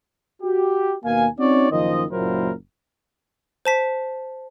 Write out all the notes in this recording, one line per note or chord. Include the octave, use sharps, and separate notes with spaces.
F#4 G4
D#2 B2 A#3 F5 G#5
C4 C#4 D#4 F#4 C#5 D5
F#1 D#3 F3 C5 D#5
F#1 A#2 F#3 E4 A#4 C5
C5 A5 B6